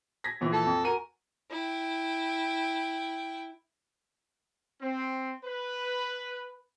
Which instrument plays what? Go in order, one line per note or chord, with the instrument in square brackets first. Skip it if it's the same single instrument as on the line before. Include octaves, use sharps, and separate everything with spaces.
[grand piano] G#6 A#6 B6
A#1 E3 F3
[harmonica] A4
[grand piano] F2
[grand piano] F#4 G#5 D#7 [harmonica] A#4
[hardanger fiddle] E4 G5
[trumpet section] C4
B4